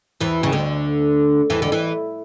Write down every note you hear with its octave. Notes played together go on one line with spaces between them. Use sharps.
E2 E3
C#3
D2 D3
E2 E3
D3
E3